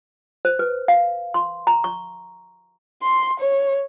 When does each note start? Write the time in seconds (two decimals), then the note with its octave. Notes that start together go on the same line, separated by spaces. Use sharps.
0.45 C5
0.59 B4
0.88 F5
1.34 C6
1.67 A#5
1.84 C#6
3.02 C6
3.39 C#5